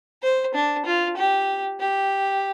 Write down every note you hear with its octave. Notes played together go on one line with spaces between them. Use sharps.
C5
D4
F4
G4
G4